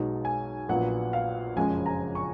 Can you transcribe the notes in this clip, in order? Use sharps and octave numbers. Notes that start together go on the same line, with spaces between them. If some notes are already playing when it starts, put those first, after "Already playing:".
Already playing: B1 B2 G#3 D#4
G#5
A#1 A#2 F#3 B3 F#5
F5
F#1 F2 C#3 F3 G#3 G#5
A#5
C#6